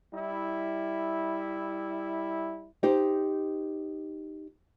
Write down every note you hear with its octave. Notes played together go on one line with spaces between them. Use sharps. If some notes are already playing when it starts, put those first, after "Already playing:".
G3 E4
D#4 G4 C5